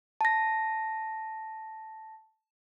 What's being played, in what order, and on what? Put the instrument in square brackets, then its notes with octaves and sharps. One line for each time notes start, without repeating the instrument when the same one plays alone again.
[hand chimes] A5 A#6